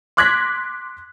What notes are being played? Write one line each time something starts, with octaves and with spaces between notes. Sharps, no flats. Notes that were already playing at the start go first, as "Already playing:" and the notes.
C6 D6 F#6 G#6 A#6 B6